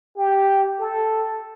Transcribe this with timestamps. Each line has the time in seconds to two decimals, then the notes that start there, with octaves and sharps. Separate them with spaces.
0.17 G4
0.80 A4